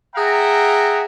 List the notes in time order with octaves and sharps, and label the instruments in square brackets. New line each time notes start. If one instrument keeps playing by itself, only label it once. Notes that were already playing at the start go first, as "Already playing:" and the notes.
[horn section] G#4 E5 F#5 G5 A#5